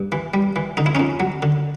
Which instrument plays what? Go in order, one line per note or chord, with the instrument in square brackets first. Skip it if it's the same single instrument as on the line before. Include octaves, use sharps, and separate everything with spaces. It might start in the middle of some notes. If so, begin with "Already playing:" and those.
Already playing: [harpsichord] G2
E3
G3
E3
D3 D#4
E4
F2 C#4 D#4
F#3
D3